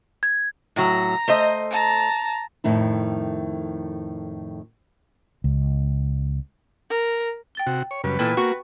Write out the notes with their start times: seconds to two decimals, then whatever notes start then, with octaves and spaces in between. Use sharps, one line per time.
0.23 G#6
0.76 A2 F#3 A#5
1.28 A3 C5 D#5
1.70 A5 A#5
2.64 F2 A2 D#3 E4
5.44 C#2
6.90 A#4
7.55 G5 A6 G7
7.67 C3 F#4
7.91 C#5
8.04 F#2 C#3 G3 B4
8.19 A#2 E3 A4 G5
8.37 A#3 F#4 C#6